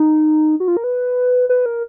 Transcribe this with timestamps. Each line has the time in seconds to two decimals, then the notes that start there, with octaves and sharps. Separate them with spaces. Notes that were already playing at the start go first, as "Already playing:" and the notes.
Already playing: D#4
0.60 F#4
0.68 F4
0.77 A#4
0.84 B4
1.49 B4
1.66 A#4